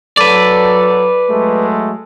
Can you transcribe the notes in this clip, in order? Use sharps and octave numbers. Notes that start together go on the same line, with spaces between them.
F#3 A4 B4 D5
F#3 G#3 A3